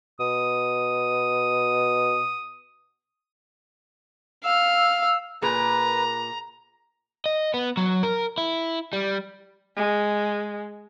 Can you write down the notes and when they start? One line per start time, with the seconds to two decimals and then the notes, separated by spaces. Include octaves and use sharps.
0.20 B2 D#6
4.44 F5 E6
5.42 A#2 A#3 G#4 B4 A#5
7.26 D#5
7.54 B3
7.77 F#3
8.03 A#4
8.38 E4
8.93 G3
9.76 G#3